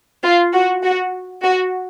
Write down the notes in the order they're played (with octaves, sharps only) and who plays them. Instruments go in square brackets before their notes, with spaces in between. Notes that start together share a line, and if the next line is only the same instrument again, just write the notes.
[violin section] F4
F#4
F#4
F#4